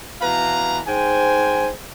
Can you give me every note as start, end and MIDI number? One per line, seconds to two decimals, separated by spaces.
0.21 0.79 47
0.21 0.79 52
0.21 0.79 71
0.21 0.79 77
0.21 0.79 82
0.87 1.69 44
0.87 1.69 72
0.87 1.69 79
0.87 1.69 80